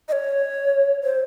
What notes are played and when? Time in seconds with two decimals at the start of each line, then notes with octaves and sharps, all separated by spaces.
0.09 D#5
0.12 C#5
1.04 C5